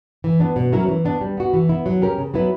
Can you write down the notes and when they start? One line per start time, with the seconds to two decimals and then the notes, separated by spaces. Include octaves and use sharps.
0.24 E3
0.40 B3 D4
0.56 B2
0.72 F#3 C#4 E4 A#4
0.88 E3
1.05 B3 D4
1.21 G3
1.37 B3 F#4
1.53 E3
1.69 B3 E4
1.86 F#3
2.02 C#4 G4 A#4
2.18 C#3
2.34 F#3 B3 E4 B4